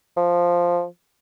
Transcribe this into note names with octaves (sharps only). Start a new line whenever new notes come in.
F3